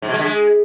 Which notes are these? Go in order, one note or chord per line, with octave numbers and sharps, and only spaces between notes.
G#2
B2
G#3
D3
G#3